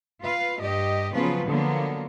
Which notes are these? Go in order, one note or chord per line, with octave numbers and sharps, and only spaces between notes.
F4 B4 F5
G2 G4 D#5
C#3 F3 F#3 B3 F4 B4
D3 F3 F#3 A#3 B3